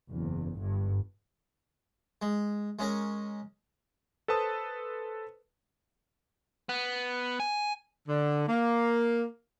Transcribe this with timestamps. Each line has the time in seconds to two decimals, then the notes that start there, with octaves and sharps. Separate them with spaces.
0.11 F#1 E2
0.57 G1 G2
2.22 G#3
2.79 G#3 C#4 A#4
4.28 A4 B4 C5 A5 D#6
6.69 B3
7.40 G#5
8.08 D3
8.48 A#3